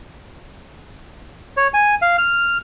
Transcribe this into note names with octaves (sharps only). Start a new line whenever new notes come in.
C#5
G#5
F5
F6